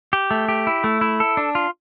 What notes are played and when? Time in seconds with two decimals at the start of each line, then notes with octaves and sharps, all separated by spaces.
0.13 G4
0.31 A3
0.49 G4
0.67 E4
0.84 A3
1.01 E4
1.20 A4
1.37 D4
1.55 F4